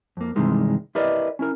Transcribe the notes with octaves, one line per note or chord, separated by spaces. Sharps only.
F2 A#3
G2 C3 D#3 E3 G#3
E4 G4 A#4 B4 D5 D#5
C#4 E4 A#4